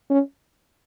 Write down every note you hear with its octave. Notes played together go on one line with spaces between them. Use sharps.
C#4